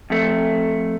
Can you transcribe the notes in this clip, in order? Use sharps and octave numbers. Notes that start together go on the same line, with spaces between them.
F2 A3